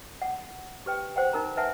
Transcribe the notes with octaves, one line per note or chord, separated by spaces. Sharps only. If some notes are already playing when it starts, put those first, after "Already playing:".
F#5
G4 B4 G5
C5 F#5 G5
D#4 A#4 A#5
B4 E5 F#5 G#5 A5